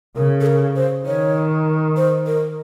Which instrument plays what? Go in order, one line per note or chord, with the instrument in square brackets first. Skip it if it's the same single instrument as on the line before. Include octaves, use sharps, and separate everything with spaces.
[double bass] C#3 [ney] A#4
[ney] A4
A#4
C5
[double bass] D#3 [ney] C#5
[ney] C5
A#4